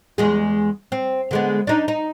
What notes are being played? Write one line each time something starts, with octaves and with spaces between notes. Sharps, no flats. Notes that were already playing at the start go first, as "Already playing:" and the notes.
E2 G#3 G#4
C4
D3 G#3 B3
D4 D#4
D#4